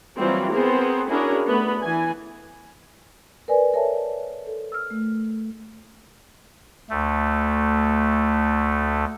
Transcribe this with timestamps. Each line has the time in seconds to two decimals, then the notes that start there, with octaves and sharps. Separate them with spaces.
0.16 E3 F#3 G3 A#3 C4 F4
0.52 B3 C4 G#4 A#4 C5
1.09 C#4 D4 E4 F#4 G#4 A#4
1.47 A3 B3 B4
1.82 E3 G#5
3.48 A#4 B4 D5 G#5
3.73 A4 A#4 C#5 E5 G#5 A5
4.47 A4
4.72 E6 F6
4.90 A3
6.90 D2 A3